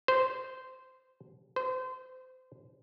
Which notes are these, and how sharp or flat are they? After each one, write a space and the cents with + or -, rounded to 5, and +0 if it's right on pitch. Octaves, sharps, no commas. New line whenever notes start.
C5 -15
C5 -30